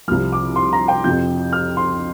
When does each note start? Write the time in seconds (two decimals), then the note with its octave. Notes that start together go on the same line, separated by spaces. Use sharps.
0.08 C2 C3 F3 F6
0.32 D6
0.56 C6
0.73 A#5
0.88 G5
1.04 F2 C3 F3 G6
1.52 F6
1.77 C6